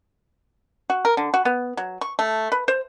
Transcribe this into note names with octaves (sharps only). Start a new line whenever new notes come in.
F#4
A#4
D3
F#4
B3
F#3
C#6
A3
B4
C5